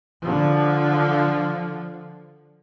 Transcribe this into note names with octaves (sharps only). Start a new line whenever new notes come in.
D3 F3